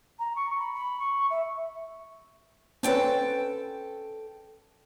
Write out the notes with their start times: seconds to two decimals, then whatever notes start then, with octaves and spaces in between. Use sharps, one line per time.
0.19 A#5
0.35 C#6
0.59 B5
0.74 B5
0.99 C#6
1.30 E5
2.83 C4 C#4 A4 B4 G5 A5